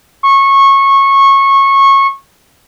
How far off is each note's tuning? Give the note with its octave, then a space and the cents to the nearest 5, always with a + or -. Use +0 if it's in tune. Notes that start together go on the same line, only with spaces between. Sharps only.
C#6 -20